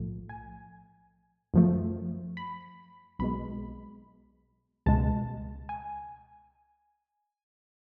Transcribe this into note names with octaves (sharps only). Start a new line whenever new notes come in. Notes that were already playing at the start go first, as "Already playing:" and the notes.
Already playing: B1 A2 F3 A3
G#5
F#2 F3 A3
B5
B1 B2 G#3 B5
C#2 B2 G#3 A5
G#5